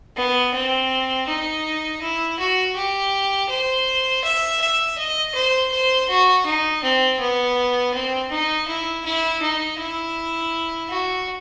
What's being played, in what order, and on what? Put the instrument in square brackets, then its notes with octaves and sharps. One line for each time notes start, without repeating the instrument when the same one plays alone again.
[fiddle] B3
C4
D#4
E4
F#4
G4
C5
E5
E5
D#5
C5
C5
F#4
D#4
C4
B3
C4
D#4
E4
E4
D#4
E4
F#4